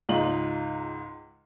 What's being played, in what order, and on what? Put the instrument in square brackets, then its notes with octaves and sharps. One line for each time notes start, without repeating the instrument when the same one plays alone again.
[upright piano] C#2 G#2 D#4 F4 F#7